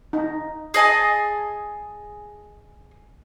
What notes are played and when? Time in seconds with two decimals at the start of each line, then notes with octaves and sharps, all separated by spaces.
0.13 D#4
0.74 G#4 D#5 G#5 A5